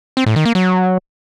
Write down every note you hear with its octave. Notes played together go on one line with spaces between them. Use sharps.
C4
A2
D#3
A#3
F#3